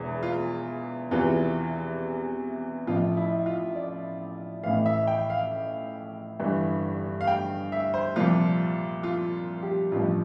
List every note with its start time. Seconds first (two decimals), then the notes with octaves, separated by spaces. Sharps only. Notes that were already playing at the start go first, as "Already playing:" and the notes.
Already playing: E1 E2 E3
0.23 F4
1.11 E2 C3 E3 F4
2.87 A1 A2 F3 F4
3.17 E4
3.46 F4
3.75 D5
4.63 A1 A2 E3 F5
4.86 E5
5.07 G5
5.30 F5
6.40 G1 G2 E3
7.21 F5
7.27 G5
7.72 E5
7.94 C5
8.16 C2 A#2 F3 F4
9.03 F4
9.63 G4
9.92 A1 G2 F3 F4